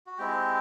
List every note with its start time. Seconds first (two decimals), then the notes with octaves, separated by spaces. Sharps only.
0.07 F#4
0.18 G#3 C4 E4 G4